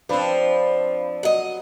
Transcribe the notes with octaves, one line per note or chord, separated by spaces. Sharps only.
F3 C4 D4 B4 F5 B5
F#3 D#5